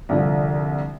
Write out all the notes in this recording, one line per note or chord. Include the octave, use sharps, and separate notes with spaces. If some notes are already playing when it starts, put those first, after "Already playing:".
C2 D3 F3